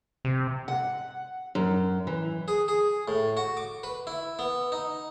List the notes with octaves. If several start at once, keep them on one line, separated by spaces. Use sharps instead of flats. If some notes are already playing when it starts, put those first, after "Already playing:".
C3
F#5
F#2
E3
G#4
G#4
A2
F#4
D6
B4
E4
B3
D#4